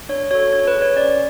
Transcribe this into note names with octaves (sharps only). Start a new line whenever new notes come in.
D4 C#5
F#4 A4 C#5
D4 C#5
B4
G#4
C#5
C#4 D5